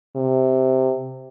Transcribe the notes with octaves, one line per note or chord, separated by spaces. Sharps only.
C3